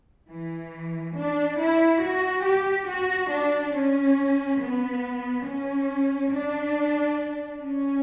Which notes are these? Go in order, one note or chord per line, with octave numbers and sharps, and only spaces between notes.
E3
D4
E4
F#4
G4
F#4
D4
C#4
B3
C#4
D4
C#4